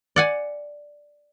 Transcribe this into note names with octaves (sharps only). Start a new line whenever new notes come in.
D5 F#5 G#5